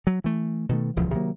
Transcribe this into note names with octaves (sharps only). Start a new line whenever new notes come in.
F#3
E3 A3
B2 D#3 A3
D#1 C#2 E3 F3
C3 D#3 F#3 A#3